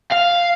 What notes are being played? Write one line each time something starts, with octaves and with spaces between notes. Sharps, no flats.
F5